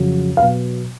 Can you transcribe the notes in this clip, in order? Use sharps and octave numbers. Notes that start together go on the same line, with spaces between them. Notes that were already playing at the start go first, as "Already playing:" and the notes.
Already playing: F2 C#3 F#3
B2 F#3 B3 F5